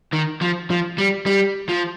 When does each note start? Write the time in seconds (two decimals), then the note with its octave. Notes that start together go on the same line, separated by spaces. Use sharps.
0.13 D#3
0.42 F3
0.70 F3
0.98 G3
1.26 G3
1.69 F3